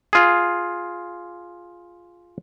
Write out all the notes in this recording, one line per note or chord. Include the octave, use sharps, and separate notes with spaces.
F4 G#4